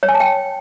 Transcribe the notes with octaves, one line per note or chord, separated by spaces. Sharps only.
C#5
G#5
A5
G5